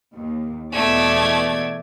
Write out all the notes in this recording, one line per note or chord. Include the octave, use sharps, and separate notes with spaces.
D#2
E2 B2 A3 D5 G#6